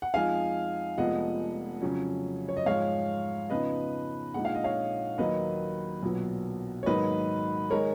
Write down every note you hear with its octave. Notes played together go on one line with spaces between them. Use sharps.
F#5
F2 F3 G#3 D#4 F5 G#5
F1 F2 F3 G#3 B3 D#5 F#5
F2 C#3 F#3 C#4
C#5
D#5
G#2 F3 G#3 C#5 F5
F2 C#3 F3 B3 D#4 B4 D#5
A#1 A#2 G#3 D#4 F#5
F5
D#5
C#5 F5
D#2 D#3 F#3 A#3 D#4 B4 D#5
B1 A#2 F#3 B3
C#5
G#2 D#3 F#3 A#3 D#4 B4 D#5
D#3 G#3 A#4 C#5